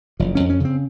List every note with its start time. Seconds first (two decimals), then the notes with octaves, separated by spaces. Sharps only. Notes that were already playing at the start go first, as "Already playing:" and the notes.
0.20 F#1 F3
0.35 F2 C#4
0.50 C#4
0.60 C#3 C4